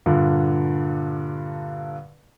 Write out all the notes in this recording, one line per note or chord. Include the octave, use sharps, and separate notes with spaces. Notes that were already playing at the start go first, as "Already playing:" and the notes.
G2 A#2 D3